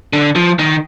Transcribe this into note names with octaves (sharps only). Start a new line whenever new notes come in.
D3
F3
D#3